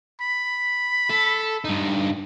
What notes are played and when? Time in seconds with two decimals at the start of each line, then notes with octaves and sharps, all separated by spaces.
0.21 B5
1.10 A4
1.64 G2 D#4